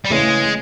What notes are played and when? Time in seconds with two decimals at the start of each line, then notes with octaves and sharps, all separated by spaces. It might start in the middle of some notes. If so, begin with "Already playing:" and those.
0.05 G3
0.10 C#3 E3 G#3 A3 C#4